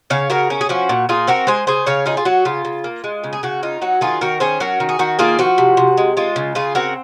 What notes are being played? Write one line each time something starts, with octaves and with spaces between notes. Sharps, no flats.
C#3 C#5 F5
C#3 F#4 A#4
C#4
G#4
F3 F#4
A#2
A#2 F4 G#4
C4 F#4 A#4
G#3 G#4 C5
C#3 G#4 C5
C#3 C#5 F5
D#4 F4 G#4
F4
F#3 F#4
C#3 F4
C#3
A#3
G#3
C#3
G#4
C#3 F#4
D#4 F4
F#3 F#4
D#3 F4 G#4
D#3 F#4 A#4
C#4 G#4 C5
F#3 F#4 A#4
D#3
G#4
D#3 F#4
A#3 F4 G#4
F3 F#4
C3
C3
G#3
G#3 F4
C#3
C#3 F4 G#4
C4 F#4 A#4